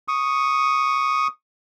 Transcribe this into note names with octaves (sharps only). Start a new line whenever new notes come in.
C#6 D#6